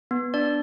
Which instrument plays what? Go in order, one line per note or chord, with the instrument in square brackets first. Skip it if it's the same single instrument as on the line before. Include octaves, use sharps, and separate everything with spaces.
[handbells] B3
D4 D5